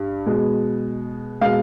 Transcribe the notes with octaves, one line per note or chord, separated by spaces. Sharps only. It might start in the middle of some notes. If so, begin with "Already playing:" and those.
Already playing: G2
B2 G#3
B2 G#3 F5